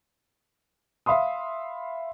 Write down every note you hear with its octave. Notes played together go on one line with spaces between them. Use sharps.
E5 F5 B5 C6 D#6